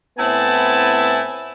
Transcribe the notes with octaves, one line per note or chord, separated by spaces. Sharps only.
A2 B3 C4 E4 G#5 A5